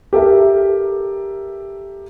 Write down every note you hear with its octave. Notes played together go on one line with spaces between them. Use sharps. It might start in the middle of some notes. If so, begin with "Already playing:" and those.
G4 A4 A#4 E5